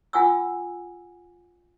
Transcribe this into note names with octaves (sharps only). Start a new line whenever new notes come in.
F4 F#5 G#5 C#6 E6